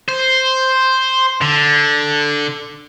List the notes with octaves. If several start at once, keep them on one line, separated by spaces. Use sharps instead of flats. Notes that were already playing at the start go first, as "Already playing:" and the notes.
C5
D3